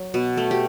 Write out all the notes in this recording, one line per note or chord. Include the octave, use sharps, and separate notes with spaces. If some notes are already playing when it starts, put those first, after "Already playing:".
Already playing: F#3
B2
A3
G4